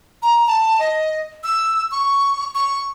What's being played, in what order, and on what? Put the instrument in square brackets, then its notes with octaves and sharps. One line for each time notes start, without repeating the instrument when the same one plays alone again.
[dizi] A#5
A5
D#5
E6
C#6
C#6